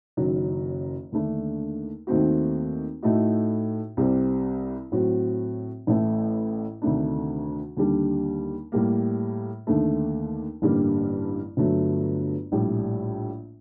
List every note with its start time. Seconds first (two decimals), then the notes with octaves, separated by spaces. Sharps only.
0.17 F#1 F#2 D#3 F#3
1.12 D#2 D3 A3 D4
2.07 D#2 D#3 A3 C4 F#4
3.03 A2 A3 D#4 F#4
3.97 C2 C3 G3 C4
4.92 A2 F#3 C4 F#4
5.87 A1 A2 A3
6.82 D2 C3 D#3 A3 D4
7.77 D#2 D3 G3 D4
8.72 A2 G3 A#3
9.67 D#2 D3 A3
10.62 A1 G2 D3 G3 A#3
11.57 G1 G2 F#3 A3
12.52 A#1 A2 G3